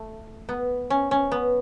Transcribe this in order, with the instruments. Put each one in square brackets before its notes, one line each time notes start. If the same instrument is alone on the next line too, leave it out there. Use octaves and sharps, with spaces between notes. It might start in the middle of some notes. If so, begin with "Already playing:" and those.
Already playing: [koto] A3
B3
C#4
C#4
B3